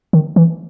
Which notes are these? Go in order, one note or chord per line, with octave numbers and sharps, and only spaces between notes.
D#3
E3